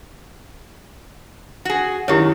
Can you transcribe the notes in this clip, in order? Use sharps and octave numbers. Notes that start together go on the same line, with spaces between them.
F#4 G#4
F#2 D#3 E4 G4 C#5